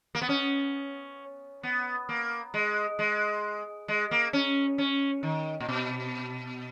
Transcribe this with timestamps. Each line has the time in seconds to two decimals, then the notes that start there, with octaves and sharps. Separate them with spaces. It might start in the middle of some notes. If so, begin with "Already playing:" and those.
0.15 A#3
0.22 B3
0.29 C#4
1.63 B3
2.09 A#3
2.54 G#3
2.99 G#3
3.88 G#3
4.11 A#3
4.33 C#4
4.78 C#4
5.23 D#3
5.60 A#2
5.69 B2